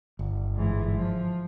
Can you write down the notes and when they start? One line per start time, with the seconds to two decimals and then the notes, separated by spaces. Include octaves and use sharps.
0.19 G1
0.56 G#2 E3
0.96 F3